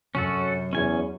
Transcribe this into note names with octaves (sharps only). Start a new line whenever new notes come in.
F#2 C3 C#4 F#4 A4
E2 C#4 G#5